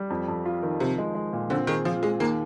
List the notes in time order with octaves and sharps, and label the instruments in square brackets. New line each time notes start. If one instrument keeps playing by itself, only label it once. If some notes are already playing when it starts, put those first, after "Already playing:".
Already playing: [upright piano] G3
F2
F2
F4
D#3
[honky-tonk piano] C3 [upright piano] F3
[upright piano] G#3
G#3
A#2
[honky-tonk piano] D3 [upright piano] C4
[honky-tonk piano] D#3 [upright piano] G#4
[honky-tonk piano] F3 [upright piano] F4
[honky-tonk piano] G#3 [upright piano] G#4
[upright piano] D#2 [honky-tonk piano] A#3